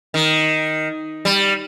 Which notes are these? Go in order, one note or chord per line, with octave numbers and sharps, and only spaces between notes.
D#3
G3